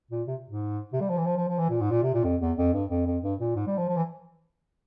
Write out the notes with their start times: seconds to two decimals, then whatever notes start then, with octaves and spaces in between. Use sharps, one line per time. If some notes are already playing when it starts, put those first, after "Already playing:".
0.11 A#2
0.27 C3
0.49 G#2
0.93 C3
1.01 G3
1.09 F3
1.17 E3
1.25 F3
1.37 F3
1.48 F3
1.58 E3
1.70 A#2
1.81 G#2
1.91 A#2
2.02 C3
2.14 A#2
2.24 F2
2.41 E2
2.57 F2
2.73 G2
2.90 F2
3.06 F2
3.23 G2
3.40 A#2
3.55 G#2
3.67 G3
3.78 F3
3.89 F3
3.97 E3